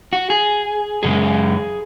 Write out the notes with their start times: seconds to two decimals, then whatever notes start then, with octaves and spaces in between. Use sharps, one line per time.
0.13 F#4
0.30 G#4
1.03 F#2 C#3 G#3 G#4